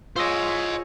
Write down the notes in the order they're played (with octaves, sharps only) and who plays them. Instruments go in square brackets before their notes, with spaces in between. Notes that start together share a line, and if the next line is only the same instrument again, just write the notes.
[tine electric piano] F4 E6 A#6 [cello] G#4 C#5 [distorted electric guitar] C5 D#5